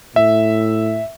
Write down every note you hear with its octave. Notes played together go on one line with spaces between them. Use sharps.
A2 E5